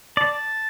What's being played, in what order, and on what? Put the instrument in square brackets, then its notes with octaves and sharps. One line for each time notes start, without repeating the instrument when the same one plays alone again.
[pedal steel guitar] D5 [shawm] A5